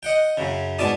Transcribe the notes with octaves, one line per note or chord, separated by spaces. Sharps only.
D#5 F#5 G5
F#2 C#3
G#2 B2 D5 A5 D#6